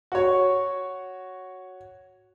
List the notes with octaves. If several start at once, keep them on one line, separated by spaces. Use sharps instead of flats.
F#4 C#5